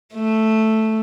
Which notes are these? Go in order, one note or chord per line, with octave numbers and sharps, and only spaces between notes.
A3